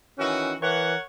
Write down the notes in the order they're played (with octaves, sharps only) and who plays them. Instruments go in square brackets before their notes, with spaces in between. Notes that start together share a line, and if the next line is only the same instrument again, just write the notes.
[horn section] D#3 E3 F#4 [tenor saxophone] C#4
[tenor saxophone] E3 [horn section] A#4 C#5 F#5